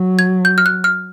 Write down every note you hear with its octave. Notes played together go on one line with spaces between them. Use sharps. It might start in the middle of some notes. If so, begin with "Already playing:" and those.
Already playing: F#3
G#6
G6
F6
F#6
F6